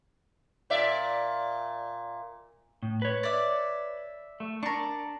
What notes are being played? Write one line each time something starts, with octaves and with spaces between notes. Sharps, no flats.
A#2 D5 E5
A2
B4 C#5
D5 E5
A3
D4 A#4 C#6